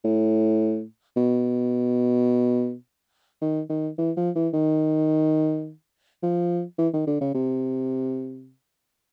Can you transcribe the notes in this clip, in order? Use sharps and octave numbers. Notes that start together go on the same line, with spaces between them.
A2
B2
D#3
D#3
E3
F3
E3
D#3
F3
E3
D#3
D3
C#3
C3